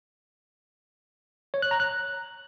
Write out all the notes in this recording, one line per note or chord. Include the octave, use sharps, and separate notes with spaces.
C#5
F#6
A#5
F#6